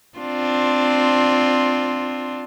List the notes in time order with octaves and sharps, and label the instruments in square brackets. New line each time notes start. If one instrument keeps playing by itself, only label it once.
[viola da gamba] C4 D4 F4